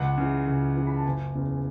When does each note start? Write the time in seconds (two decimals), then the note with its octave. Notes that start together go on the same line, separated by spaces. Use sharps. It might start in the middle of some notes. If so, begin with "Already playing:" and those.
Already playing: C#2 F#5
0.18 C#3 E3
0.48 C#2
0.76 C#3 E3
0.87 B5
0.96 A5
1.06 F#1 G#5
1.35 E2 C#3